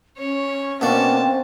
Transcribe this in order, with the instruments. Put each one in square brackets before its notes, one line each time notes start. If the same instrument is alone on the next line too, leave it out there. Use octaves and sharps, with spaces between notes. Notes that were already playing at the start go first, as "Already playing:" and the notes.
[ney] C#4 [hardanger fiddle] C#5
[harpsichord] B2 A#3 D4 [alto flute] C4 [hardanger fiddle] A5